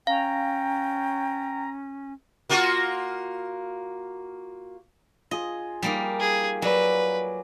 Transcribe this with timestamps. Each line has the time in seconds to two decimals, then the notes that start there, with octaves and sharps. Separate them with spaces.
0.07 C#4 F5 G5 A#5
2.49 A#3 F4 F#4
5.31 F4 G#4 D#5
5.82 G3 A#3 D#4
6.20 G#4
6.62 F#3 B4 D5 G#5